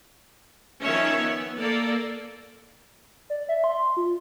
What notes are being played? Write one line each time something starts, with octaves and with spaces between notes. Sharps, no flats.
D#3 F3 C#4 C#5 E5
B3
A#3 A4 D5
D5
E5
C6
F4